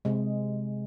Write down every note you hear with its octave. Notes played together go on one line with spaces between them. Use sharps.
C3 G#3